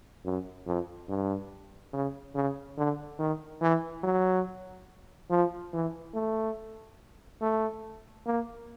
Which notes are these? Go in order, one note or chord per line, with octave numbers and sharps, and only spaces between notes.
F#2
F2
G2
C#3
C#3
D3
D#3
E3
F#3
F3
E3
A3
A3
A#3